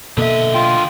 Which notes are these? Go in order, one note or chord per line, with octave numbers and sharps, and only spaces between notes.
B2 D3 A#3 A4 D#5 E5
F4 G5